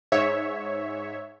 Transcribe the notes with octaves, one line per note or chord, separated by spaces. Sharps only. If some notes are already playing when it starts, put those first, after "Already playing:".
G#2 C#5 E5